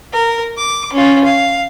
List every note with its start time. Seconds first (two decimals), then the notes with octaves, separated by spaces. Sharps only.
0.13 A#4
0.57 D6
0.93 C#4 F4
1.24 F5